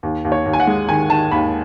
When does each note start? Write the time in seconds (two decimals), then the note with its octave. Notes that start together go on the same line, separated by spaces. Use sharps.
0.03 D#2
0.25 D#2
0.32 C#5
0.46 D#2
0.53 G#5
0.60 F#5
0.67 G#3
0.89 D#3 G#5
1.10 D#3 A5
1.31 D#2 B5